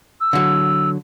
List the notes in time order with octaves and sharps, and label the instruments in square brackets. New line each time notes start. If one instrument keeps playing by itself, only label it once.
[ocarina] E6
[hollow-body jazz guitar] D3 F#3